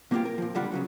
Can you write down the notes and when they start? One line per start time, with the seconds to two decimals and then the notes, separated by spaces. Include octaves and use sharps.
0.11 A#2 A#3 C4 D#4 F4 G4
0.25 A#4
0.38 A#2 F3
0.55 C#2 D3 G3 F4 F#5 B5
0.72 C#3 E3 F#3